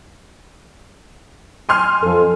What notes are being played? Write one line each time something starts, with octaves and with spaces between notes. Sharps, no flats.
G#5 C6 F6
F2 A4